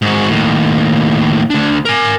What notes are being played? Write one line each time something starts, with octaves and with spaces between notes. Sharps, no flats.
G#2 F#4
D#2 A2
D2 D4
A#4 G#5